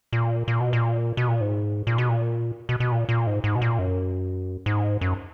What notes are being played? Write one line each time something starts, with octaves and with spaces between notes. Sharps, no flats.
A#2
A#2
B2
A#2
B2
A#2
G#2
A#2
B2
A#2
B2
B2
A#2
A#2
G#2
G#2
B2
A#2
F#2
G#2
F#2